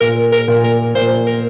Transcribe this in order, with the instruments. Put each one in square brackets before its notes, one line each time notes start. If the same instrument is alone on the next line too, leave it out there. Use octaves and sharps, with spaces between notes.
[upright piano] A#2 [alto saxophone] A#4
[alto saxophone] A#4
[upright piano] A#2
[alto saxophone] A#4
[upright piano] A#2 [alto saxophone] C5
[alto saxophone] A#4